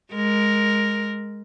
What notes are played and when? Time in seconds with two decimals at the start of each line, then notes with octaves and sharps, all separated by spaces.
0.12 G#3 A#4